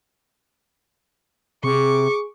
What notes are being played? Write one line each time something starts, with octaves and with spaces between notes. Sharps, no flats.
C3 G#4 C#6 D6